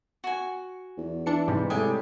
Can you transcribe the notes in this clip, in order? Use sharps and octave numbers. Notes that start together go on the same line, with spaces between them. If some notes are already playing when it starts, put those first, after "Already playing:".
F#4 G#5
E2
E3 D4 C#7
G#2 C3 G3
A2 C3 G3 G#3 G4 E5 G#5